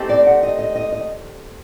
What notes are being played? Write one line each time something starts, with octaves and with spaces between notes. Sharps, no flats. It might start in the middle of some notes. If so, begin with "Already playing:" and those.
Already playing: A3 C4 D#4 G4
D5
F#5
D#5
D#5
D#5
D#5